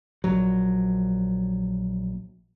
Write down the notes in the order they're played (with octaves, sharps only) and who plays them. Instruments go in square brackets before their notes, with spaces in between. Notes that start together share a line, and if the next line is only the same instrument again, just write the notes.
[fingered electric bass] A#1 F#3